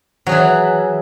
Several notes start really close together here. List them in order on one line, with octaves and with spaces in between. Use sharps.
F#3 G#4 E3